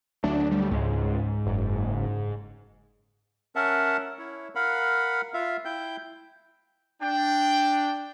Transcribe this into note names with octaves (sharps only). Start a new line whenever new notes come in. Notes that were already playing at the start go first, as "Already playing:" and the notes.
D2 F#3 A3 D4
G3
C#2 G#2 G#3
F#1
C#4 A#4 E5 F#5 A5
E4 C#5
A#4 F5 F#5 B5
F4 E5 F5
E4 G5 G6
D4 G5